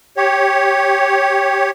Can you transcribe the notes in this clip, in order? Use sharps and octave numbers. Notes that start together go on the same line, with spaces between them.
G4 C#5